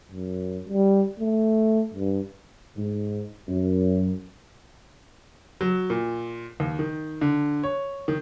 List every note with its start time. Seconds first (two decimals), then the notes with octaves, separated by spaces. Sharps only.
0.12 F#2
0.69 G3
1.20 A3
1.94 G2
2.76 G#2
3.48 F#2
5.61 F#3
5.90 A#2
6.60 D#2
6.79 D#3
7.21 D3
7.64 C#5
8.08 D#3